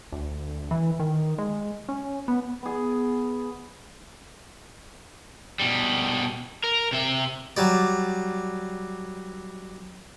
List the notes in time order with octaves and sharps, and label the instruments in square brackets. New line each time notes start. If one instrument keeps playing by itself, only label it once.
[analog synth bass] D2
E3
D#3
G#3
C#4
B3
[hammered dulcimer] B3 G#4
[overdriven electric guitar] B2 G3
A#4
C3 E5
[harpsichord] F#3 G3 D5